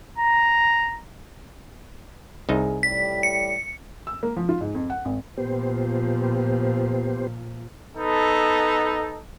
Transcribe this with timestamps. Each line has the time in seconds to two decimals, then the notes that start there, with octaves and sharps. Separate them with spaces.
0.18 A#5
2.49 C2 D#4 G#4
2.83 A2 G3 B6
3.23 C#7
4.07 E6
4.23 A#3
4.37 F3
4.49 F4
4.61 G#2
4.75 F2
4.90 F#5
5.05 G#1
5.38 A#2 F3 B3 G4 C5
7.96 B3 D#4 A4